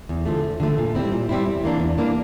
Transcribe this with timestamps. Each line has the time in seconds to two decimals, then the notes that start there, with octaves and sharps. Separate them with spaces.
0.09 E2
0.26 D3 F3 A3
0.43 E2
0.60 D3 F3 A3
0.78 A#2
0.95 G3 C4 E4
1.12 A#2
1.29 G3 C4 E4
1.46 E2
1.64 E3 A#3 D4
1.80 E2
1.98 E3 A#3 D4